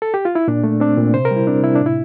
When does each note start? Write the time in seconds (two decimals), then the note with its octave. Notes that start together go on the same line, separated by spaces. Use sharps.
0.02 A4
0.14 G4
0.25 F4
0.35 E4
0.48 A#2 D4
0.64 A3
0.80 C4 D4
0.97 A#2
1.14 C3 C5
1.25 A#4
1.31 G3
1.36 E4
1.47 C4 D4
1.64 C3 E4
1.75 D4
1.81 A2
1.86 E4